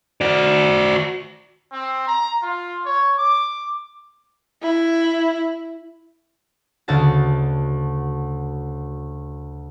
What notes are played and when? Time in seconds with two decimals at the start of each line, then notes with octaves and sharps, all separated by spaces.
0.21 F#4 D5
1.72 C4
2.08 A#5
2.43 F4
2.85 C#5
3.18 D6
4.63 E4
6.88 D2 C#3 F#4 A5 A6